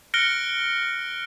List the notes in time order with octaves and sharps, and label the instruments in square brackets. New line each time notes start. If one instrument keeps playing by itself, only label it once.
[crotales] F6 F#6 A#6 C#7 D7 G7